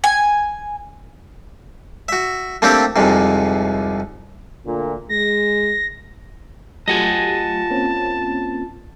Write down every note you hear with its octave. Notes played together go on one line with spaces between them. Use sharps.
G#5
F#4 E5
A3 A#3 C4 D4 G4 A4
C2 F2 G#2 C3
D2 A#2
G#3 A#6
F#3 A3 F4 G4 D#5 F#5 G#5 A5
A#3 C4 C#4